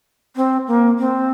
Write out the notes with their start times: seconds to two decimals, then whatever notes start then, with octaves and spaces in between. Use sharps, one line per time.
0.36 C4
0.67 A#3
0.99 C4